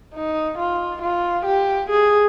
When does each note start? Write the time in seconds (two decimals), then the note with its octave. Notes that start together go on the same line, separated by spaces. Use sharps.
0.14 D#4
0.58 F4
1.02 F4
1.46 G4
1.90 G#4